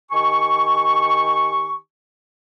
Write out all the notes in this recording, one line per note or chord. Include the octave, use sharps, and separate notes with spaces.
D#3 G4 G#5 C#6